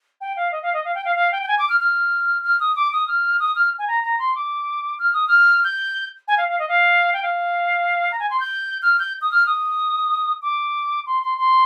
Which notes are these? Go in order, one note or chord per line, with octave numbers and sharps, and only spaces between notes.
G5
F5
D#5
F5
D#5
F5
G5
F5
F5
G5
G5
G#5
D6
F6
F6
F6
D#6
D6
D#6
F6
D#6
F6
G#5
A#5
A#5
C6
D6
F6
D#6
F6
G6
G#5
F5
F5
D#5
F5
G5
F5
A#5
G#5
C6
G6
F6
G6
D#6
F6
D#6
D6
C6
C6
C6